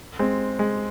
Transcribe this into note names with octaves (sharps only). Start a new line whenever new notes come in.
G#3 C4
G#3